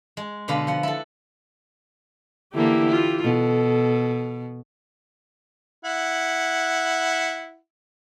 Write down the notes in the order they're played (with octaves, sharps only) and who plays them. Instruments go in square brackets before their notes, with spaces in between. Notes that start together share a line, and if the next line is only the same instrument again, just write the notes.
[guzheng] G#3
B2 D3 B4 F5
F3 F#5
E4 A4
[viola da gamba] D3 E3 A#3 [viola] E4 G4
[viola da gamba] F4
[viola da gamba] B2 [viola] A4
[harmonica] E4 F#5